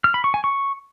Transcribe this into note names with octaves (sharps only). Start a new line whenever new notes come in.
F6
B5
C#6
G#5
C#6